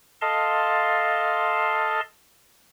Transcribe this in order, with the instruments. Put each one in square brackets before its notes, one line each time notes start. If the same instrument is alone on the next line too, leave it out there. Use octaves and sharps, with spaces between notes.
[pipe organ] A4 D#5 F5 A5 C6